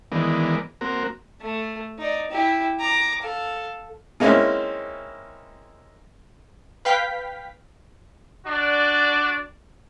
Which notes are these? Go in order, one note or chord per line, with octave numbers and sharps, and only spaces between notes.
D#3 E3 G#3 B3 A#4 D5
A#3 C4 F#4 A#4
A3
D#4 D5
E4 G4
A#5 D6
A4 F5
G#3 A#3 C4 C#4 D#4 E4
B4 F5 G5 B6
D4 F#4 D5